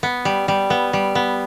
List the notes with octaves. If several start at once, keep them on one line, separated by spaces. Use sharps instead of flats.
B3
G3
G3
B3
G3
B3